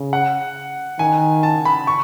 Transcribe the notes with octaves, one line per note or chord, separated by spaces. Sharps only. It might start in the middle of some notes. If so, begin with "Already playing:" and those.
Already playing: C#3
F#5
D#3 G#5
A5
B5
C#6